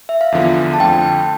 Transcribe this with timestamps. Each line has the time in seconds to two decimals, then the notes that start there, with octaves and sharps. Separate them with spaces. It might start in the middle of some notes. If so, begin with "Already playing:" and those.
0.09 E5
0.21 F5
0.32 E2 D3 F3 B3
0.74 A5
0.79 F2 D3 F3 A3 G5